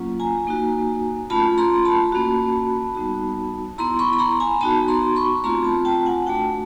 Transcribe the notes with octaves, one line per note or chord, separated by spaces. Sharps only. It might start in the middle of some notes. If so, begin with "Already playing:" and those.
Already playing: F#3 A#3 C#4 F4
G#5 A#5
A#3 D#4 F#4
A3 C#4 F4 A5 B5
A#5 C6
A5 B5
A#3 C#4 F#4
G3 B3 D#4 F#4
B3 E4 A#5 C6
B5 C#6
B5
A#5 C6
G#5 A#5
B3 D#4 F#4 A5 B5
A#5 C6
B5 C#6
A3 C4 F4 A#5 C6
A5 B5
G5 A5
F#5 G#5
A3 D4 F#4 G5 A5